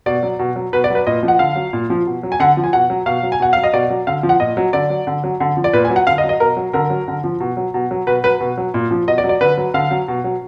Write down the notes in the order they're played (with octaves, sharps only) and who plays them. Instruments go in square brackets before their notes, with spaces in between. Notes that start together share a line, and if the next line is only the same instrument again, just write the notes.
[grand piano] B2 D5
F#3
B2
F#3
B2 B4
D5
F#3 B4
A#2 D#5
F3
F#5
D3 F5
F#3
A#2
F3
B2
F#3
G#5
D3 F#5
F3
G#5
B2 F#5
F#3
B2 F5
F#3
G#5
B2 F#5
F#3 F5
D#5
B2 D5
F#3
D3 F5
F3
F#5
A#2 D#5
F#3
D3 D5
F#3
D3
F#3
D3
F3
D5
A#2 B4
G#5
F#3
F#5
D3 F5
D#5
F#3
D#5
B2 A#4
F#3
D3 A#4
F#3
D3
F3
B2
F#3
B2
F#3
B2 B4
F#3 B4
B2
F#3
A#2
F3
B2 D#5
D5
F#3
D5
D3 B4
F#3
D3 F5
F#3
B2
F#3